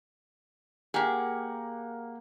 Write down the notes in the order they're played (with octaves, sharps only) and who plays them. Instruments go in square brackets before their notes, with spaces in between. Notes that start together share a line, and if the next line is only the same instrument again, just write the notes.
[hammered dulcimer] A#3 F#5 [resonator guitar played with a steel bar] G4 G#4